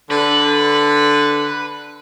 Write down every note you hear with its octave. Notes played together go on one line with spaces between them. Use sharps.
D3 B4